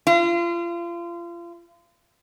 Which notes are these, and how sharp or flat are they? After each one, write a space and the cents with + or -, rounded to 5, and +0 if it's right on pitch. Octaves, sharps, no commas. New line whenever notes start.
F4 -30